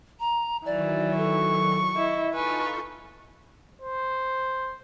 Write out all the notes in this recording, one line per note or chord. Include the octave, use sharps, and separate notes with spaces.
A#5
D#3 E3 F#3 D5
A4 C#6
E4 D#5
D#4 F4 A4 B4 G#5 C#6
C5